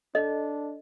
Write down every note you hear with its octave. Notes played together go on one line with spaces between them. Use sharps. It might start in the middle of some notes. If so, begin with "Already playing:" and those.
D4 A4 D#5